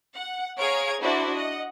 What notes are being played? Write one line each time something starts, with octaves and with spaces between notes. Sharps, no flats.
F#5
G#4 C#5 F5 A#5 G#6 D7
D4 E4 F#4 C5 D5
D#5 F#5